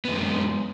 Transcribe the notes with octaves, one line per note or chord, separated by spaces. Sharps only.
F#2 G#3 B3